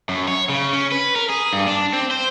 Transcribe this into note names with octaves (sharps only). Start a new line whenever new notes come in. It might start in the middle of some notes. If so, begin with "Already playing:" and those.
F#2
C#5
C#3
C#4
B4
A#4
G#4
G2
D4
C4
C5